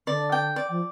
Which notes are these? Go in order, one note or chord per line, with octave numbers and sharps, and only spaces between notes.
D3 D5
G5
D5
F3